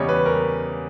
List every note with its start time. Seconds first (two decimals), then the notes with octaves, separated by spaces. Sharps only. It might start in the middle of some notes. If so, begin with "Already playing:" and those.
Already playing: E2 C#3 G3 C#4 C#5 D#5
0.09 B4
0.26 A#4